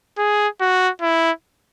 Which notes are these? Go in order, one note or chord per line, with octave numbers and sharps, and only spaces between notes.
G#4
F#4
E4